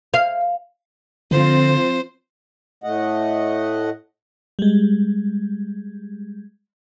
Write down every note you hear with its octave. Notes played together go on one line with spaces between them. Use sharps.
F5
D3 F3 C4 F4 C5
A2 A3 D#5 F#5
G3 G#3